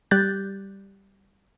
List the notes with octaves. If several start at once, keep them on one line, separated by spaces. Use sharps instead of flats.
G3 G4 F#6 G6 A6